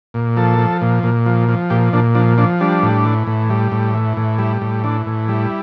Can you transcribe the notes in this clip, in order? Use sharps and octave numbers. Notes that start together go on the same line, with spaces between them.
A#2
F3 A4
F3
A#2
A#2
F3
F3
A#2 G4
A#2 D4
F3 D4
F3 D4
G3 D4
A2
E3
A2
G3
A2
E3
A2
G3 E4
A2
E3 D4
A2
G3 E4